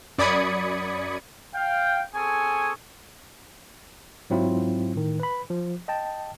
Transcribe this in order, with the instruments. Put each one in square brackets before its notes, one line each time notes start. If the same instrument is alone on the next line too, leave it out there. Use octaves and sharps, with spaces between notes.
[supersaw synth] F#2 D5 B5 D#6 G#6 C#7
[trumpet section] F5 G5
C4 G#4 A4 G#5 C#6
[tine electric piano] G#2 F#3 C4 E4 F4
A2 D#3
B4 B5
F3
D#5 G5 A5